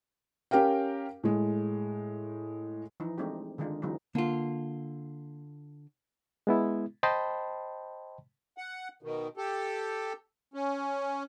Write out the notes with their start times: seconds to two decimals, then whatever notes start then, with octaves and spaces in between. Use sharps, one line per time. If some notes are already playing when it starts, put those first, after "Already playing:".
0.51 C#4 G4 A#4 F5 G5
1.23 A2 G#3
3.00 E3 F3 D#4
3.18 G#3 A3 C4 D4 D#4 G4
3.58 D3 D#3 G#3 D4 D#4 F4
3.82 D3 E3 F#3 G#3 C4 D#4
4.15 D3 A#3 F4
6.47 G#3 B3 E4
7.03 C5 D#5 G5 A5 B5 C6
8.58 F#5
9.03 B2 D#3
9.37 G4 A4
10.54 C#4